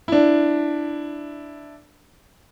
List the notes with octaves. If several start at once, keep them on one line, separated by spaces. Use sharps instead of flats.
D4 E4